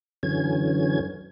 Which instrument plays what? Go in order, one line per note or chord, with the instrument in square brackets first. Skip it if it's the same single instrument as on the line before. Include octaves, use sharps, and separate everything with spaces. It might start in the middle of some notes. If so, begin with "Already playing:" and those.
[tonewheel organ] F#2 D3 E3 F#3 C#4 G#6